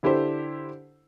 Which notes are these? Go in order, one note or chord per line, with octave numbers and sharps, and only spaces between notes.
D3 E4 G4 A4 C5